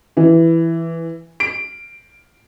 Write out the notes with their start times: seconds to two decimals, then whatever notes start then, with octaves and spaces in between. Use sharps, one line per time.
0.17 E3
1.40 D7